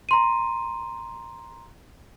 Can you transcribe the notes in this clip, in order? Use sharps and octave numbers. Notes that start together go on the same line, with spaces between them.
A#5 C6 D#7